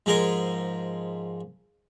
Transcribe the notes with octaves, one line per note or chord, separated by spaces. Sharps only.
G#2 F3 G#4 A#4 D#5